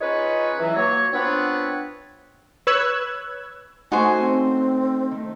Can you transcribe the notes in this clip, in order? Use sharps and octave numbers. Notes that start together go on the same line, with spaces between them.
C#4 D#4 F4 G#4 B4 C#5
E3 F#3
F#3 A#3 C#5
B3 C4 D4 F4 B4 C#5
B4 C#5 E6 F#6 G#6
A3 C#4 D#4 F#4 C5 G#5
C4
D#3 A3